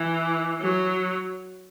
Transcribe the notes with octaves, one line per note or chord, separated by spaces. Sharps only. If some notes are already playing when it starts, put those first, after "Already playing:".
Already playing: E3
F#3